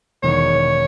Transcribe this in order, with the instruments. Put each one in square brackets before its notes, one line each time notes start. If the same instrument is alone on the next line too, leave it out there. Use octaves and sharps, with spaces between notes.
[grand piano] E1 E2 D#3 [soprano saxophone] C#5